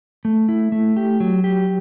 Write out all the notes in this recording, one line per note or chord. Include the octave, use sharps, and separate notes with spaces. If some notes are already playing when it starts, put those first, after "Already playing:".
A3
E4
A3
G4
F#3
G4